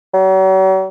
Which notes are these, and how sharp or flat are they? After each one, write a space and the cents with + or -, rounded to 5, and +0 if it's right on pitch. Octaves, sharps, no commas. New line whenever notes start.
F#3 +45